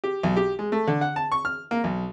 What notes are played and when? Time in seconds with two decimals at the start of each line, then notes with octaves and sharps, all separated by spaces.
0.04 G4
0.23 B1
0.36 G4
0.59 G#3
0.72 A3
0.87 D3
1.01 F#5
1.16 A5
1.32 C#6
1.45 F6
1.71 A#3
1.84 B1